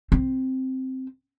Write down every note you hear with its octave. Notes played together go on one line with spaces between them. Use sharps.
C4